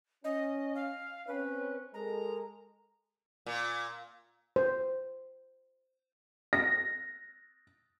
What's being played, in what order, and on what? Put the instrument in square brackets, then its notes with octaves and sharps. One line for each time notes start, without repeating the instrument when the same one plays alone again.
[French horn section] C#4 [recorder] D#5
[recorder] F5
[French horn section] C4 C#4 [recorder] B4
[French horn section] G#3 A4 A#4 [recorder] A#5
[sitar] A#2
[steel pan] C5
[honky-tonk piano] A#6